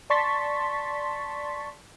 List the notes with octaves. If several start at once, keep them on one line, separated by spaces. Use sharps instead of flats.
D5 A5 C6 C#6 A6 B6